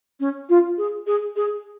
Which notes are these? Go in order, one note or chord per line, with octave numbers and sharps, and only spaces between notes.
C#4
F4
G#4
G#4
G#4